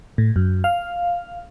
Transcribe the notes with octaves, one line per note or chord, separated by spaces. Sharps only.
A2
F#2
F5